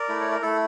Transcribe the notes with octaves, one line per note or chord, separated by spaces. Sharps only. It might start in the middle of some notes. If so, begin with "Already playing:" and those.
Already playing: A#4 D5
A3 E4
C#5
A#4
A3 E4 A4